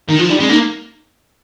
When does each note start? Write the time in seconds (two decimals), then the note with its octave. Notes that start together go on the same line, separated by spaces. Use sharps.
0.09 D#3 D#4
0.19 F3 F4
0.29 G3 D#4
0.40 G#3 C#4
0.49 A#3 D#4